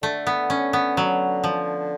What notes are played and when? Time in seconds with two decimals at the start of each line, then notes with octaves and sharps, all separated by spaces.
0.03 D3 A3
0.27 B3
0.50 C#4
0.73 B3
0.97 F#3
1.44 F3